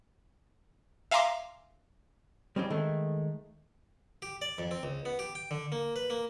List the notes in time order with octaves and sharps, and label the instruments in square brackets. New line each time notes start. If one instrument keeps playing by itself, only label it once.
[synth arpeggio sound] E5 F5 G#5 A#5 C6 D6
[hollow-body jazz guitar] G3 C4 C#4 D#4 F#4 G4
D#3 G#3 A3 A4
[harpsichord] G4
D5
F2
C4
C#2
B3
G4
G5
D3
A#3
B4
A#3